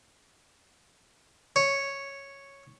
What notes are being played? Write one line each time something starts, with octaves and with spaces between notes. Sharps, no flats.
C#5